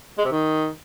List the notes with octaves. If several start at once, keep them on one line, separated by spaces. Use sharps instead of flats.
G#3
C3
D#3